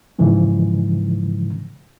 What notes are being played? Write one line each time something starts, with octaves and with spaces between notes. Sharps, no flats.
G#2 C#3 E3 F3 G#3